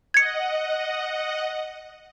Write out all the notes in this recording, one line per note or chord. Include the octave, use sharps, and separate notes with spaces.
D#5 F#5 G#6 C#7